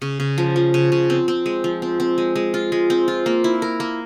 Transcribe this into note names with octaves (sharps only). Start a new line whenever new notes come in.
C#3
C#3
F3
F3
C#3
C#3
C4
C4
G#3
F3
C4
C4
G#3
G#3
F4
G#3
C4
F4
A#3
E4
A#4
A#3